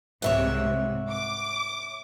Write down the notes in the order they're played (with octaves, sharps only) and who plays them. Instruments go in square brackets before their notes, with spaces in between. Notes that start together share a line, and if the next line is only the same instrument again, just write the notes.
[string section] C2 G#2 C3 [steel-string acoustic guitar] C#5 E5 F#5
[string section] D6